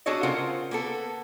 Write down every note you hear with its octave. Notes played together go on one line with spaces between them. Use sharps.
D4 F#4 G#4 A4 C#5 D#5
C#3 F4 A#4 C5 F#5
A#3 B3 A4